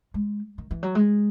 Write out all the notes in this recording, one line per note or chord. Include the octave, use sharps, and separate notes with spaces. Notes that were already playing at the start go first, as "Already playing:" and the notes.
G#3
D#3
E3
F#3
G#3